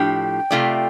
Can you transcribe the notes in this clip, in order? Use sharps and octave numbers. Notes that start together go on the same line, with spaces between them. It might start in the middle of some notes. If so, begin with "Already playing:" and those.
Already playing: A2 F3 D4 G4 G5
C3 F3 A3 F4 D5